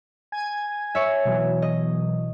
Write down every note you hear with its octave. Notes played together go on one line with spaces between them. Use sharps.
G#5 G#6
C#5 E5
B2 E3 F#3
D#5